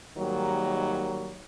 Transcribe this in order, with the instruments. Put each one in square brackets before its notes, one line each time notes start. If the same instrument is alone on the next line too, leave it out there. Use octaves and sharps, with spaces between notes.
[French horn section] G#2 D#3 F#3 G3 A#3